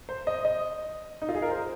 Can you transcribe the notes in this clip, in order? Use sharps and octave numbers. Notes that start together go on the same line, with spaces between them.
C5
D#5
D#5
D#4
F4
G#4
A#4
C5